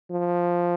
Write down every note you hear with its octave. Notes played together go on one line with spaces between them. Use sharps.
F3